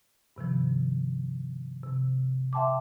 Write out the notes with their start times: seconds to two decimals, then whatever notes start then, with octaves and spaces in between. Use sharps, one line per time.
0.36 G2 C3 D#3 F3
1.83 C3
2.53 E5 F#5 G5 A5 C6 D6